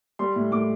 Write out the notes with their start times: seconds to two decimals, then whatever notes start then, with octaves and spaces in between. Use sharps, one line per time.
0.19 G3 C6
0.36 A2
0.51 A2 D6